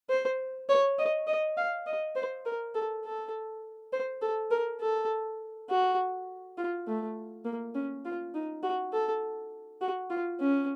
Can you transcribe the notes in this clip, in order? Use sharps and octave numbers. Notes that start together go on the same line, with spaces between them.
C5
C#5
D#5
D#5
F5
D#5
C5
A#4
A4
A4
C5
A4
A#4
A4
F#4
F4
A3
A#3
C#4
F4
D#4
F#4
A4
F#4
F4
C#4